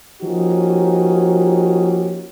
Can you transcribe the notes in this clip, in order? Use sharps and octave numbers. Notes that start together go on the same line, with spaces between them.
F3 A#3 C#4 D#4 F#4 G4